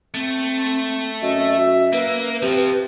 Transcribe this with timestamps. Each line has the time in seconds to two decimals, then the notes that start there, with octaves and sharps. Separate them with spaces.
0.14 A3 C4
1.22 F#2 D#5 E5
1.56 F#4
1.93 A#3 B4
2.42 C3 F3 C4